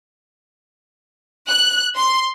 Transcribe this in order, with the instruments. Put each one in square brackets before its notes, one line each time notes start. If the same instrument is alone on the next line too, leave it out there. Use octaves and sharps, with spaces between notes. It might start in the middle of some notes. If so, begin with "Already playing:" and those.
[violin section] F#6
C6